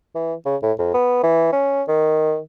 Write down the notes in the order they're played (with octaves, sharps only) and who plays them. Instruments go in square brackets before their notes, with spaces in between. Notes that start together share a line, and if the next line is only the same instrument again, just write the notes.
[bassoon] E3
C#3
A2
F2
B3
E3
C#4
D#3